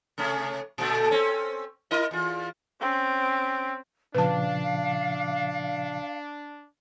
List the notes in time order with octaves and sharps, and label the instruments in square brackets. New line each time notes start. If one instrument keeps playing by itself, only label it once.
[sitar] C3 A3 C#4
A#2 D3 A3
C4 C#4
E4 A#4 D#5
E2 F4
[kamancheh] C4 C#4
[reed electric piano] A#2 C#3 F3 [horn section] D4 [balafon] B4 A5 [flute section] F5